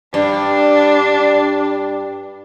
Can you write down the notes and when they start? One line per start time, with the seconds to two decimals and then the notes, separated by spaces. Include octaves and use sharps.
0.14 G2 D4